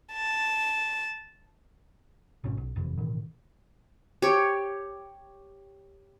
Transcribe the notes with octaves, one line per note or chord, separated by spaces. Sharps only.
A5
G#1 B2 C#4
B1
F#1 F2 C3 E3
A1 B2 D#3 E3
G4 C#5